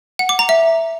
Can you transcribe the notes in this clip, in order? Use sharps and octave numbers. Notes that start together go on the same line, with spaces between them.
F#5
D6
A#5
E5